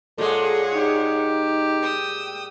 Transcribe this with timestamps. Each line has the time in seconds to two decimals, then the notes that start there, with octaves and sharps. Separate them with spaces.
0.18 A#2 G#3 G#4 A4 C#5 F#5
0.74 D#4 G4
1.82 G5 D#6 E6